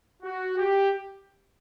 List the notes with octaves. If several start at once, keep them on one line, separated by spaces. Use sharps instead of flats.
F#4
G4